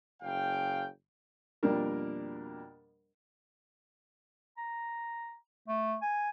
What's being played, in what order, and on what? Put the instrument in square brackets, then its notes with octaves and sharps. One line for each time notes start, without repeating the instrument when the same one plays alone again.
[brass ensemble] F#1 C#3 F5 G5
[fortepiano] F2 B2 G3 A#3 D4 A#4
[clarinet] A#5
A3
G#5